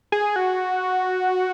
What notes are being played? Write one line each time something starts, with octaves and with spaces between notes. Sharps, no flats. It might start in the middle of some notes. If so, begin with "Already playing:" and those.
G#4
F#4